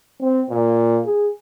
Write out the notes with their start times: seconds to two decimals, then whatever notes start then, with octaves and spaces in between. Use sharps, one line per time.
0.20 C4
0.50 A#2
1.06 G#4